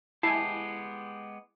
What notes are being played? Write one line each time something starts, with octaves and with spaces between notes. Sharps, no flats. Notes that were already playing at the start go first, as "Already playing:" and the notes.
G#3 B3 E4 G4 G#5 A5 C7